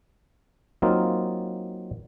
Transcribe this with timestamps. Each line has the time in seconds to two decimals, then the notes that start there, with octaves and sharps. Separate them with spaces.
0.82 F#3 A#3 C4 D#4 F4